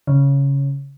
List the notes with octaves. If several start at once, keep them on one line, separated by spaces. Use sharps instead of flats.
C#3